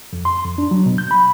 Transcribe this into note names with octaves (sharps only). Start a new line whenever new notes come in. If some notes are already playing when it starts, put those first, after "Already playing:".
F2
C6
F2
D4
F#3
B2
G6
B5